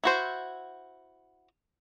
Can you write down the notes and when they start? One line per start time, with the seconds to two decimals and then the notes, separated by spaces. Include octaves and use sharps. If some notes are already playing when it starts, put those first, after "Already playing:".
0.04 E4 F#4 C5